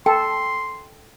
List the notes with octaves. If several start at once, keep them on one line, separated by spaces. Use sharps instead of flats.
A4 G5 C6